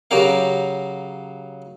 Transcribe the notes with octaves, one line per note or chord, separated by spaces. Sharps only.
C#3 F#3 F#4 G4 A#4 F5